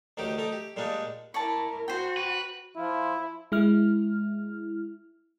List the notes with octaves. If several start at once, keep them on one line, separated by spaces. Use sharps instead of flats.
D2 D#3 F#3 D#4 G4 D6
A3 D#4 A#5 D6
G4
A#2 G3 G#3 A#3 D4 D#4
E4 A#4 C#5 D5 A5
F#4 C5 G5
B4
F3 E4 F4
G#3 E4 F6